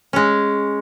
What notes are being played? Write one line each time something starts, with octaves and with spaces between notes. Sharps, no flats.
G#3 C#4